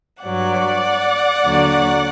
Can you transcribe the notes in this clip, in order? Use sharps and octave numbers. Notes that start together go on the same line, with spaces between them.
G2 F#3 D5 F#5
D#2 D3 F#3